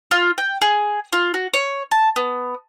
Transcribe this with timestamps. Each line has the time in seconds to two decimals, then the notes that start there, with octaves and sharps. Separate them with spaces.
0.11 F4
0.38 G5
0.62 G#4
1.13 F4
1.34 F#4
1.54 C#5
1.91 A5
2.16 B3